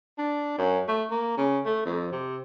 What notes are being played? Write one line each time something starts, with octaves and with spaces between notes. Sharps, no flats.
D4
F#2
A3
A#3
C#3
A3
F2
C3